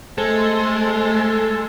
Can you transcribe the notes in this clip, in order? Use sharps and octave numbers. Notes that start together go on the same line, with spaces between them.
G#3 A3 C4 A4 C6